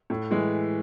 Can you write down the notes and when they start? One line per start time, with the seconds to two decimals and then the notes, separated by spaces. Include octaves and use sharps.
0.10 A2
0.31 E3 G#3